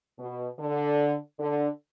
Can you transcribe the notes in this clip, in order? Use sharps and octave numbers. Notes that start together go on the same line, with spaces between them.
B2
D3
D3